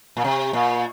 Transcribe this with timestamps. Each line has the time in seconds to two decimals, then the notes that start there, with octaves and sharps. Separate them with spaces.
0.17 A#2
0.24 C3
0.53 A#2